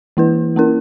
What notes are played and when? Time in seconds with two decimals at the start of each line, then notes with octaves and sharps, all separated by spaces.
0.17 E3 A#3 E4 B4
0.56 A#3 C#4 E4 A#4